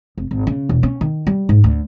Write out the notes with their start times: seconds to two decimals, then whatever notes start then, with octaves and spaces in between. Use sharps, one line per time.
0.18 F1
0.31 G#1
0.47 C#3
0.69 E1
0.83 C#4
1.01 D#3
1.27 G3
1.49 G#2
1.64 D2